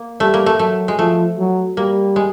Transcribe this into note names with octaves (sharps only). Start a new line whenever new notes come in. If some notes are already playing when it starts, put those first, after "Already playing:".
Already playing: A#3
G3 A3
A#3
A3
F#3 A3
G#3
F3 A3
F#3
G3 A#3
G#3